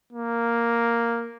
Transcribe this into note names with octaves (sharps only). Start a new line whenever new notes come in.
A#3